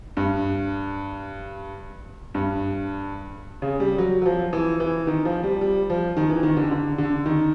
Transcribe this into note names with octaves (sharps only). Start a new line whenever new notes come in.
G2
G2
C#3
G3
F#3
F#3
F3
E3
E3
D#3
F3
G3
G3
F3
D#3
E3
D#3
D3
D3
D3
D#3